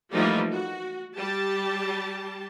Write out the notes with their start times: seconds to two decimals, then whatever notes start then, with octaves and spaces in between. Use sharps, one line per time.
0.11 E3 F3 G3 A3 A#3 D#4
0.52 F#4
1.16 G3 G4 A5